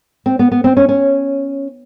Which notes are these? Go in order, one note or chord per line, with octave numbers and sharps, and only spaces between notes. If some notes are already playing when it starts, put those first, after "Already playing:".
C4
B3
B3
C4
C#4
C#4